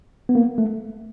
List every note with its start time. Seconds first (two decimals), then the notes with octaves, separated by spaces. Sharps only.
0.29 B3
0.35 A#3
0.58 A3